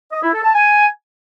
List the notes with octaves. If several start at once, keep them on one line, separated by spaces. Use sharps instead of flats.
D#5
E4
A4
A5
G#5